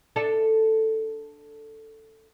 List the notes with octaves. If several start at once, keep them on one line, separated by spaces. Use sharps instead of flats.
D4 A4